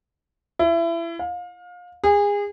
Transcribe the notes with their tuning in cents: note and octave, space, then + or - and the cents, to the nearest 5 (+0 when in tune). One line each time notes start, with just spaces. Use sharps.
E4 +25
F5 +30
G#4 -30